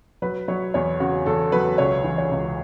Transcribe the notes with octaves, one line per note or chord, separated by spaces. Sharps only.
F#3 B4
F#3 C#5
E2 C#5
C#3 F#4
E2 A4
F#3 B4
C#2 C#5
E3
C#5
C#2